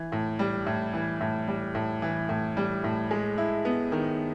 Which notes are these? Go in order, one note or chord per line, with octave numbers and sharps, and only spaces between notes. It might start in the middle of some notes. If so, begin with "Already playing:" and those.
Already playing: E3
A2
G3
A2
E3
A2
G3
A2
E3
A2
G3
A2
G#3
E4
B3
D#3